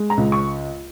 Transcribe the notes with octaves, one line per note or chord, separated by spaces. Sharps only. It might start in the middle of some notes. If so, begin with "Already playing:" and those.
Already playing: G#3
A#5
C#2
C#6